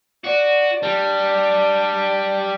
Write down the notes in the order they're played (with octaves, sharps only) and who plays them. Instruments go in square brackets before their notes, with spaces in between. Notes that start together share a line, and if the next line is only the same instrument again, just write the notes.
[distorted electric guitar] F#4 [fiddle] D5
[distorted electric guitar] G3 [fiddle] D4